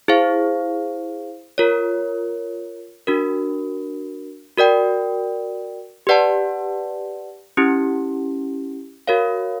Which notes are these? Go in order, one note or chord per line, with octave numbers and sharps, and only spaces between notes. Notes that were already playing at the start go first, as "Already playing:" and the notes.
E4 G#4 C5 F5
F4 A#4 C#5
D4 F#4 A#4
F#4 A#4 D5 G5
G4 B4 D5 F#5 A5
C#4 E4 G4
F#4 A#4 C#5 F5